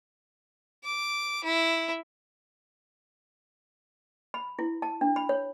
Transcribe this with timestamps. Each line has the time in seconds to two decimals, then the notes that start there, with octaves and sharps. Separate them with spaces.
0.84 D6
1.44 E4
4.34 B5
4.59 E4
4.82 A5
5.01 D4
5.16 B5
5.29 C#5